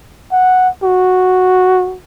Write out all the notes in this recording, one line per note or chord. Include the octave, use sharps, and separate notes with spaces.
F#5
F#4